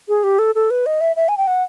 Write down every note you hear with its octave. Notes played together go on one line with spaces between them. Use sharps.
G#4
G4
A4
A4
B4
D#5
E5
E5
G#5
G5
F#5